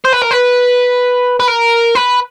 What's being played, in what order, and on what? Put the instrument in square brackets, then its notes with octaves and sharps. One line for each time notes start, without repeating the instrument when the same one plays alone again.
[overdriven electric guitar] C5
B4
A#4
B4
B4
A#4
B4